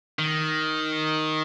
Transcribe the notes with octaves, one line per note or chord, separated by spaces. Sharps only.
D#3